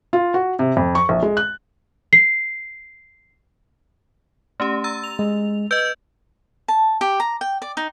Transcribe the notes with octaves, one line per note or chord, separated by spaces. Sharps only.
F4
F#4
C3
F2
C#6
A#1
G#3
F#6
C7
A3 C#4 G4
A#5 E6 A6
F7
G#3
B4 D#5 G6
A5
G4
A#5
G5
D5
D#4